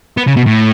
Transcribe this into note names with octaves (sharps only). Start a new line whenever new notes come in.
B3
C#3
B2
A2